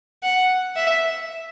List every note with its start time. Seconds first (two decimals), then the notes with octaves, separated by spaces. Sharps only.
0.23 F#5
0.76 E5